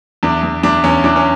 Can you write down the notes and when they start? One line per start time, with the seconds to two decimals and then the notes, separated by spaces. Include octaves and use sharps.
0.23 E2 D4
0.43 E2
0.63 E2 D4
0.84 E2 C#4
1.04 E3 D4
1.16 C#4